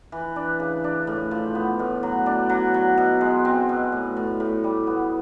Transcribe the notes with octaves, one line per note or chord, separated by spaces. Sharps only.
E3
D4
C#3
D4
A2
F3
B3
A2
F#3
D4
F#3
F#3
B2
G#3
C4
B2
A2
A2
A2
G3
B3